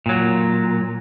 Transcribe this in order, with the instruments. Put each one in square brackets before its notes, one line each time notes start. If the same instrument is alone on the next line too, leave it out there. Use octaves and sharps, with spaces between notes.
[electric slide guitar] A#2 F#3